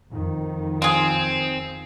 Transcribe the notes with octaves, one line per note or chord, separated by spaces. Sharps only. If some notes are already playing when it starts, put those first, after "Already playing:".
F2 D#3
C4 F4 G#4